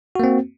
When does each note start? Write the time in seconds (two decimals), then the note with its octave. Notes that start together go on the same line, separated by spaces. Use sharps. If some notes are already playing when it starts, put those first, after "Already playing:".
0.15 F#4
0.20 A#3
0.24 C4